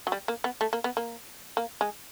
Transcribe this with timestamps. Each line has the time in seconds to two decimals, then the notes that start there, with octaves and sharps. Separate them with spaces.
0.07 F#3
0.12 G3
0.28 A#3
0.44 B3
0.61 A3
0.73 A#3
0.84 B3
0.97 A#3
1.57 A#3
1.81 G#3